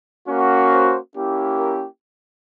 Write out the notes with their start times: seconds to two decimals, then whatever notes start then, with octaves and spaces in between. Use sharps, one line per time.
0.27 A#3 C#4 F#4
0.71 C5
1.15 A#3 C#4 E4 G4
1.59 A#4